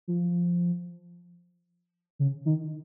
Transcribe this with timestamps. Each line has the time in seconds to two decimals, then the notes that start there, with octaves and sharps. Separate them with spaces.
0.08 F3
2.19 C#3
2.45 D#3